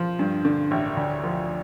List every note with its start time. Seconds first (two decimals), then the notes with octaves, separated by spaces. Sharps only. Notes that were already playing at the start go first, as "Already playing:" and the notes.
Already playing: F3
0.19 G2
0.45 D3
0.71 A1
0.97 D2
1.24 F3